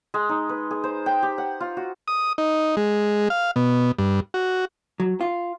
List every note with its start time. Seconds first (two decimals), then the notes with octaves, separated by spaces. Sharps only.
0.14 G#3
0.29 D#4
0.49 B4
0.71 G#4
0.84 C5
1.06 G5
1.23 G4
1.38 F#5
1.60 F4
1.77 F#4
2.08 D#6
2.38 D#4
2.77 G#3
3.30 F5
3.56 B2
3.99 G2
4.34 F#4
5.00 F#3
5.21 F4